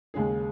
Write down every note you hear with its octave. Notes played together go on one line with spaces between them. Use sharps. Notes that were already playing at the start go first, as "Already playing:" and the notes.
D#2 C#3 G#3 C#4 G#4